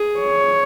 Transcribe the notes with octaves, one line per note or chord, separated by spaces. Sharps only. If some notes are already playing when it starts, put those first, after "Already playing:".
Already playing: G#4
C#5